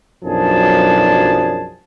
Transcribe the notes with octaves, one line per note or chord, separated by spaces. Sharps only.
B1 F#2 F3 D4 G#4 A5